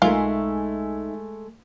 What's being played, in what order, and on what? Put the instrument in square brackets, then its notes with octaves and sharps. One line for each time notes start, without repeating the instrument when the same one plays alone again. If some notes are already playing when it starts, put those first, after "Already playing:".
[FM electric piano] B1 G#5 [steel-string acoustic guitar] G#3 A3 [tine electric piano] D#4 E5 [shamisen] F4 A#4